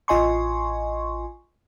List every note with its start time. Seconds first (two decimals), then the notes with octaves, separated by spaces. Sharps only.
0.08 A1 F4 D#5 G#5 C6 C#6